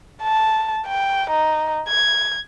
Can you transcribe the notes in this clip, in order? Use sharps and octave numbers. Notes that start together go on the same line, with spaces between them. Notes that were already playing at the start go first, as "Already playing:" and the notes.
A5
G5
D#4
G#6